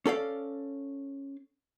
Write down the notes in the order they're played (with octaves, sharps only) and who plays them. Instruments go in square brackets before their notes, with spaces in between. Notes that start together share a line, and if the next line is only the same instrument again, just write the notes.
[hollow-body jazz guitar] C#4 A4 D5 F5